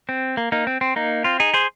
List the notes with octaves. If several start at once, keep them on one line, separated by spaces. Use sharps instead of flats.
C4
A#3
A#3 D#4
C4
C4
A#3 D#4
C4 F4
D#4 G#4
G#4 C5